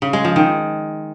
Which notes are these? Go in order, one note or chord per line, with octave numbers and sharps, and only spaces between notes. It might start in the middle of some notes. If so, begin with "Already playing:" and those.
C#3
G#3
F3
D#3